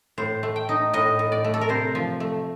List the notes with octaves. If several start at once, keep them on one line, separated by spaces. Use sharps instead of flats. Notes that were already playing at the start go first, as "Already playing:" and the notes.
A2 C5
A3
G5
D#4
A2 D#5
A2
D5
A3
A4
A#4
C3 C5
F3
A3